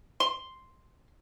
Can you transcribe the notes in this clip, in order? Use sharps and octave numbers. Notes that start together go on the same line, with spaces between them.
C6